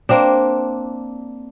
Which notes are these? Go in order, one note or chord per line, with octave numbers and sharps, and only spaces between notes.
A#3 C4 D4